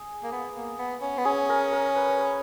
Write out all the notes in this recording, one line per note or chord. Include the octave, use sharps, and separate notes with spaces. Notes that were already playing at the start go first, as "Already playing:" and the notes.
Already playing: G#4
A#3
B3
A#3
B3
C#4
B3
C#4 G#4
A#4
A#4
B4
B4